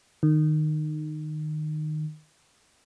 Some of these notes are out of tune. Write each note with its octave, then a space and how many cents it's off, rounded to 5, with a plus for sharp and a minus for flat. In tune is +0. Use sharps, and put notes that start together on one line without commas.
D#3 -20